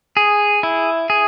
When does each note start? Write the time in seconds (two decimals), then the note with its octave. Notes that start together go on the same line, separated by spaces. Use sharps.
0.17 G#4
0.63 E4
1.10 G#4